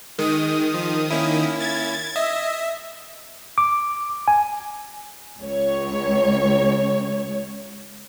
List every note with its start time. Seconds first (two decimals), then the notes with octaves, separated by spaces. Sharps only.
0.18 D#3 G#3 D#6
0.74 F3
1.11 A#3 C#4 E4
1.60 G#6 A6
2.16 D#5 E5
3.58 D6
4.28 G#5
5.41 C#2 C#5